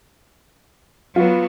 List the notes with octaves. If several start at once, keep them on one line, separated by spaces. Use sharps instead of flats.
F#3 B3 F4 B4